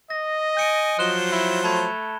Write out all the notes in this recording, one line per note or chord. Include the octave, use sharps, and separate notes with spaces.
D#5 A#6
G#5 G6 C#7 D7
F3 F#3 C5 F#6 E7 G7
E4
A3 A5 B5 G#6